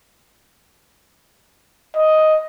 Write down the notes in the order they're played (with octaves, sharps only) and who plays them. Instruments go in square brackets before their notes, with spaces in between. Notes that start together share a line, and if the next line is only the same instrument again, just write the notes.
[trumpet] D#5